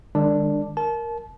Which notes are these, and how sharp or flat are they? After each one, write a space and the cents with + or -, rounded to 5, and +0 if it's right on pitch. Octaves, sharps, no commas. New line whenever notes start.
D#3 -40 G#3 -40 D4 +0
A#4 +0 A5 -30